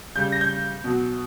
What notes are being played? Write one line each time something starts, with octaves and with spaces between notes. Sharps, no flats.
C#3 G3 G6
A#6
G6
B2 F#3